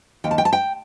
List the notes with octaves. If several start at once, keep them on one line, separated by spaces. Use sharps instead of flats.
D#2 G5
A5
G5
A5
G5